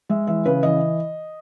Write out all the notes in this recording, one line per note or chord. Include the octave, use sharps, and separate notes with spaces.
G#3 E5
E3 E5
C#3 B4
E3 D#5